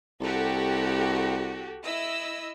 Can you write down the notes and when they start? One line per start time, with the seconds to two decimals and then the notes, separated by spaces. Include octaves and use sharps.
0.20 C2 F#4 G4 A4
1.84 E4 D#5 E6